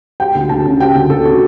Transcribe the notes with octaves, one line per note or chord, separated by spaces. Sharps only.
G3 G5
D2
D2 A5
C#3
G3 G5
D2
D2 A4
C#3 F#4